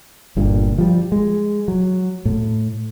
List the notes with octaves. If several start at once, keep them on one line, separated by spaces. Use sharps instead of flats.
G1 G2 A#2
F3 G3
G#3
F#3
A2